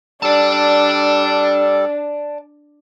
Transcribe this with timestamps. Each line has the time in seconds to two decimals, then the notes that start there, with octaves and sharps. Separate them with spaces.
0.23 G3 D4 A4 D5 A5